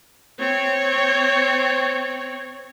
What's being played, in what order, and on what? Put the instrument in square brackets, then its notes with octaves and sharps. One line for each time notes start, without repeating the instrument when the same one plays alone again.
[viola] C4 C#5